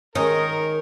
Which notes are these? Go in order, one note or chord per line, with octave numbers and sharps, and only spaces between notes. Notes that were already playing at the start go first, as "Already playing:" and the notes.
D#3 G#3 C#4 A#4 D#5